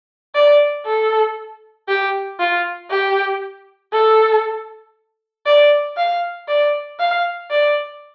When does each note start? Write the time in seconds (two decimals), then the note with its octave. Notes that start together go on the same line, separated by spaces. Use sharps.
0.35 D5
0.86 A4
1.89 G4
2.40 F4
2.91 G4
3.93 A4
5.46 D5
5.97 F5
6.48 D5
7.00 F5
7.51 D5